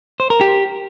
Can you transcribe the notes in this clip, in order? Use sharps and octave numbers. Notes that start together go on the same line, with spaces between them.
C5
A#4
G4